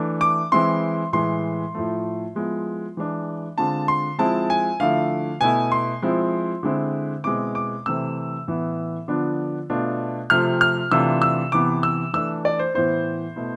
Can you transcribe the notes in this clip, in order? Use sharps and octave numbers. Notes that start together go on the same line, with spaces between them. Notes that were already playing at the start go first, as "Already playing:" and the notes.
Already playing: E3 A3 D4
D6
E3 G#3 C4 E4 C6
A2 E3 G#3 C6
A2 F3 A3
F3 G#3 B3 E4
E3 G#3 D4
D3 G#3 C4 F4 A5
C6
F3 G#3 C4 E4 A5
G#5
D3 F3 A3 E4 F5
B2 A3 E4 G#5
C6
F3 G#3 C4 E4
D3 G#3 C4 E4
B2 G#3 C4 E4 D6
D6
C3 E3 A3 C4 E6
A2 E3 B3
D3 F3 B3 D4
B2 A3 D4 F4
C3 F3 A3 C4 F6
F6
C3 E3 A3 D4 F4 E6
E6
C3 E3 B3 E4 D6
E6
E3 A3 D4 E6
D5
C5
A2 E3 B3 E4 C5
B2 A3 E4